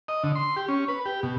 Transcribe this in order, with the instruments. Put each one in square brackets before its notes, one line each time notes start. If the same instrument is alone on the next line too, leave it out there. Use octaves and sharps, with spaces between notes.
[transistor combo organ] D#5
D3
C6
G4
C#4
B4
G4
B2